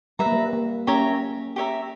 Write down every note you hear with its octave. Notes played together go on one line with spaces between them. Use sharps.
G3 B4 E5 A#5
A#3
G3
A#3
A#3 C#4 G4 C#5 E5 A#5
G4 C#5 E5 A#5